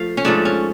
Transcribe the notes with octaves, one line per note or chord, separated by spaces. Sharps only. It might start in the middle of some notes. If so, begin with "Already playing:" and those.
Already playing: F3 A3 F5
C#4
G#2 F3 A3 D4
C#4